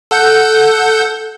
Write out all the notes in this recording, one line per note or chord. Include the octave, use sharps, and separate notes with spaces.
A4 F#5 G6